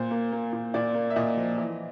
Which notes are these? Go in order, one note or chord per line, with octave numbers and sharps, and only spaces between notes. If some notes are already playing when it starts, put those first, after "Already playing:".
Already playing: A#2 C5
A#3
A#3
A#2
A#2 D5
A#3
E5
A#2 D#5
F3
E3